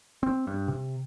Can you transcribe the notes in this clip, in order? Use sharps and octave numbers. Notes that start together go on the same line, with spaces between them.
C4
G2
C3